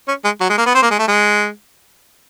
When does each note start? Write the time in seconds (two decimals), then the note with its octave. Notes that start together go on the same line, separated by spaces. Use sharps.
0.08 C#4
0.24 G#3
0.40 F#3
0.49 G#3
0.58 A#3
0.66 B3
0.74 C4
0.82 A#3
0.90 G#3
0.99 A3
1.07 G#3